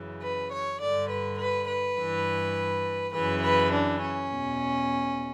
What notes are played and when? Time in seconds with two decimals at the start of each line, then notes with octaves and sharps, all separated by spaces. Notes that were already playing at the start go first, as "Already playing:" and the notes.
Already playing: F#2 C#3 E3
0.22 B4
0.52 C#5
0.81 G2 D3 D5
1.09 B4
1.39 B4
1.68 B4
1.97 G2 E3
3.13 F#2 C#3 E3 B4
3.43 B4
3.73 D4
4.01 C#4
4.30 E2 B2